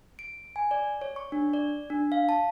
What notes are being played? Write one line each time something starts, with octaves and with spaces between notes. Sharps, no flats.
D7
G#5
D5
C#5
C#6
D4
D5
D4
F5
A5